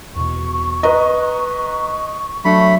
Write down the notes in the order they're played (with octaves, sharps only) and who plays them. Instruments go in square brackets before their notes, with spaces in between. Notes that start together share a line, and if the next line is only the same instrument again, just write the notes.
[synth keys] E2 B2 [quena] C#6
[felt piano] B4 D#5 [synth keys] A#5 F#6
[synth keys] F#3 D4 [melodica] A3 B5